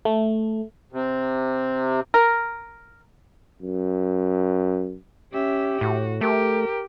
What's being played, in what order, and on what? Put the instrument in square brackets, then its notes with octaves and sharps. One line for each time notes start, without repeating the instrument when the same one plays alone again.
[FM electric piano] A3
[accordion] C3
[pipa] A#4
[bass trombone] F#2
[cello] C#4 E5 [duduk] G4
[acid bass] A2 [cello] F#4
[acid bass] A3 [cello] G4 [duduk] A#4